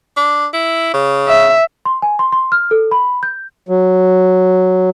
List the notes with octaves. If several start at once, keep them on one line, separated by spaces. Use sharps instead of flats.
D4
E4
C#3
E5
C6
G#5
C6
C6
F6
A4
B5
G6
F#3